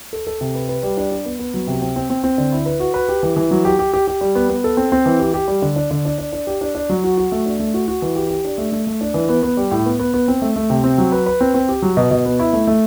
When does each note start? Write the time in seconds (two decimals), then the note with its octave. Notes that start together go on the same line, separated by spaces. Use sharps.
0.13 A4
0.27 A4
0.41 C3
0.55 B4
0.69 B4
0.83 G3
0.97 D4
1.11 D4
1.25 B3
1.39 B3
1.54 F#3
1.67 C3
1.82 C4
1.96 C4
2.10 C4
2.24 C4
2.38 D3
2.52 E4
2.66 B4
2.80 F#4
2.94 B4
3.09 G4
3.23 E3
3.36 E3
3.51 F#3
3.65 G4
3.79 G4
3.94 G4
4.07 G4
4.21 G3
4.35 B3
4.49 B3
4.64 A4
4.77 C4
4.92 C4
5.06 E3
5.20 G4
5.34 G4
5.48 G3
5.62 D3
5.76 D4
5.91 D3
6.05 D4
6.18 D4
6.33 D4
6.47 G4
6.61 D4
6.75 D4
6.90 F#3
7.04 F#4
7.17 F#4
7.32 A3
7.46 D4
7.60 A3
7.74 F#4
7.88 F#4
8.02 E3
8.16 G4
8.30 G4
8.45 D4
8.58 A3
8.72 A3
8.87 A3
9.01 D4
9.14 E3
9.29 B3
9.43 B3
9.57 G3
9.71 A2
9.86 B3
9.99 B3
10.14 B3
10.28 C4
10.42 A3
10.56 A3
10.70 C3
10.84 C4
10.98 F#3
11.12 B4
11.26 B4
11.41 C4
11.54 C4
11.69 G4
11.82 F#3
11.97 B2
12.11 B2
12.26 B3
12.40 E4
12.53 A3
12.67 A3